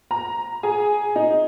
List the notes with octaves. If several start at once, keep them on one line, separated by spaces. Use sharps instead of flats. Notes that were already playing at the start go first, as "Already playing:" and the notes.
A#5
G#4
D#4